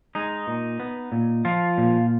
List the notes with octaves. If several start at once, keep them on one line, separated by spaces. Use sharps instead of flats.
G#3 D#4
A#2
B3
A#2
F3 F4
A#2